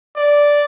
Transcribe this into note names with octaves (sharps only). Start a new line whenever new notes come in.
D5